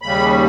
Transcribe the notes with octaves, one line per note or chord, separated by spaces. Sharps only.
D#2 C#3 G3 B5